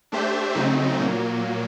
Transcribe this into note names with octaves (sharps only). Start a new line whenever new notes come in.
A3 D4 G4 C5 E5
C#3 F#3 A3 C4 D#4
A#2 F#3 A#3